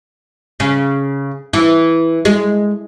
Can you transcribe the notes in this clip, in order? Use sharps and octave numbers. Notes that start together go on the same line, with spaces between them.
C#3
E3
G#3